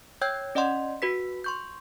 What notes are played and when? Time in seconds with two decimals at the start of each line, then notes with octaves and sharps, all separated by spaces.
0.21 C#5 G5 E6 G6 G#6
0.55 C#4 D5 D#5 F#5 C6
1.02 F#4 B4 B6
1.44 C6 C#6 G6